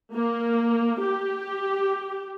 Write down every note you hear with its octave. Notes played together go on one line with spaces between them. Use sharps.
A#3
G4